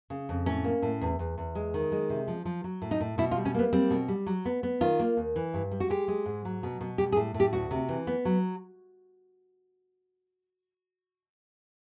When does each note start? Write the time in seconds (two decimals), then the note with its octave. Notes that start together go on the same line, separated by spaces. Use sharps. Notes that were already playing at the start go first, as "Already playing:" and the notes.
0.10 C#3
0.29 F2
0.46 A2 C#4
0.64 A#3
0.82 A2
1.01 E2
1.19 E2
1.38 E2
1.55 G#3
1.74 D#3
1.92 G#3
2.10 C3
2.28 F3
2.45 F3
2.64 F#3
2.82 A2
2.91 D#4
3.01 A2
3.18 B2 E4
3.31 F4
3.36 G3
3.45 C#4
3.54 A#3 B3
3.73 G3 C4
3.90 B2
4.08 G3
4.27 F#3
4.45 B3
4.63 B3
4.81 D#3 F4
4.99 A#3
5.17 D#2
5.36 E3
5.54 G2
5.71 G3
5.80 F#4
5.90 G#3 G4
6.08 G#3
6.26 G#2
6.45 F#3
6.63 B2
6.81 B2
6.98 G3 G4
7.12 G#4
7.16 A2
7.34 A2
7.40 G4
7.53 D2 F#4
7.71 C3
7.89 E3
8.07 B3
8.25 F#3